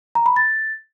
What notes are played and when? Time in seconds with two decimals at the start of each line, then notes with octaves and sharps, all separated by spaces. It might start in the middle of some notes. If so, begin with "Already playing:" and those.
0.15 A#5
0.26 B5
0.36 A6